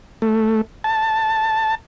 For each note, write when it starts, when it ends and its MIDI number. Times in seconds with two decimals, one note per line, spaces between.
0.22 0.61 57
0.84 1.75 81